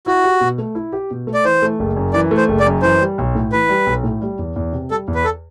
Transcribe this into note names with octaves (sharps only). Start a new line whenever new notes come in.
E4 F#4
G4
B2
A3
E4
G4
B2
A3
D5
E3 C5
A3
F#1
F#2
E3 D5
A3
C5
F#1
D5
F#2
E3 C5
G3
B1
A2
E3 B4
G3
B1
A2
G3
E2
E2
C3
G3 A4
E2
B4
A4